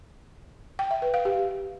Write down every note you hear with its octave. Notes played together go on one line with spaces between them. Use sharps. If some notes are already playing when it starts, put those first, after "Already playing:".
G5
E5
B4
F5
G4